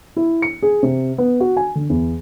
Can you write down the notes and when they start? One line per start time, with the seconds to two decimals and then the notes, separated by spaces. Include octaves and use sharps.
0.17 E4
0.42 C#7
0.63 G#4
0.83 C3
1.18 B3
1.40 F#4
1.57 G#5
1.75 D3
1.90 E2